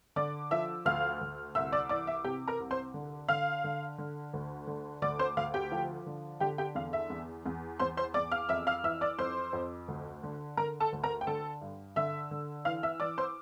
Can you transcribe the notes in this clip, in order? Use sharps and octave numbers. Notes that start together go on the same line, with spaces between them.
D3 D5 D6
F3 E5 E6
D2 F5 F6
D2
C2 E5 E6
D5 D6
E3 D5 D6
E5
C3 G4 G5
A#4 A#5
C2
C5 C6
D3
D3 F5 F6
D3
D3
D2
D3
D2 D5 D6
C5 C6
D2 F5
G4 G5
F3
D3
D3 G4 G5
G4 G5
E2 F5
E5
E2
E2
E2 C5 C6
C5 C6
E2 D5 D6
F5 F6
F2 E5 E6
F5 F6
E3 E5 E6
D5 D6
F2 C5 C6
F2
D2
D3
D3 A#4 A#5
A4 A5
D2
A#4 A#5
G5
D3 A4 A5
G2
D3 E5 E6
D3
E3 F5 F6
E5 E6
E3 D5 D6
C5 C6